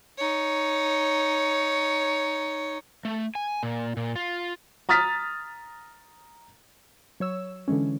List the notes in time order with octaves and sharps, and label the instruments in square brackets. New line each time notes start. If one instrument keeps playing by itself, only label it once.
[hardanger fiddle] D#4 C#5
[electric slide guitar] A3
G#5
A#2
A#2
F4
[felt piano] A#5 D#6 F6 A6 B6
[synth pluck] F#3 C#5 E6
D3 E3 G#3 C#4